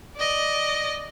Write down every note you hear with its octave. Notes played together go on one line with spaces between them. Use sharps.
D5 D#5